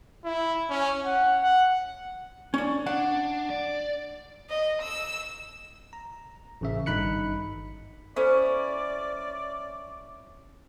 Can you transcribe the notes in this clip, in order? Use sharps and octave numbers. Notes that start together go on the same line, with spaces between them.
E4
C#4
F#5
F#5
C#4 D4
D4 F#5
D5
D#5
E6
A#5
A1 C#3 E5
G#1 G2 D#4 B5 F#6 C#7
C#4 E4 A4 C5 D5